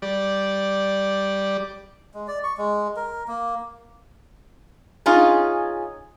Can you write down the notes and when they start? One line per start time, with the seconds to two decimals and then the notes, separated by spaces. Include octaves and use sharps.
0.02 G3 D5
2.14 G#3
2.28 D5
2.44 C#6
2.57 G#3
2.96 A#4
3.28 A#3
5.06 C#4 D#4 F4 G#4